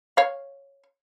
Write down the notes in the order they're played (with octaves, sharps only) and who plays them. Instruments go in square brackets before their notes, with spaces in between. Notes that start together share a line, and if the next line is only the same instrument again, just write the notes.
[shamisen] C#5 F5